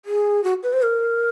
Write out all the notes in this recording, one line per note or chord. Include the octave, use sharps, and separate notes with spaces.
G#4
F#4
B4
C5
A#4